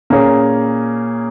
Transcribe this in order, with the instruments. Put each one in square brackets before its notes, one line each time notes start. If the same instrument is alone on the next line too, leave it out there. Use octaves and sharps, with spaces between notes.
[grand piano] A#2 A#3 C#4 G#4